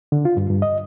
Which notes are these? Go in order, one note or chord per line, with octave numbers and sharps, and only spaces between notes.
D3
F4
G2
G2
D#5